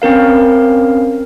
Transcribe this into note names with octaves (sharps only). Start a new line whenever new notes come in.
C4 C#4 A#4 F5